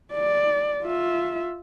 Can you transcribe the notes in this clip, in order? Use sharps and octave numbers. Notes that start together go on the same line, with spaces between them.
D5
F4 E5